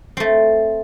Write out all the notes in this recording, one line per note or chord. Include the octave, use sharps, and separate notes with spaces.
A3 C4